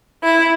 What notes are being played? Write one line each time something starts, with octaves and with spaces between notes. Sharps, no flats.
E4